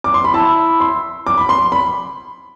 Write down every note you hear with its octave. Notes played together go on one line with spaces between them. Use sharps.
D6
C6
B5
E4 A5
C6
D6
B5
C6
B5